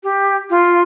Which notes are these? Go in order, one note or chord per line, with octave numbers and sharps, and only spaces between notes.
G4
F4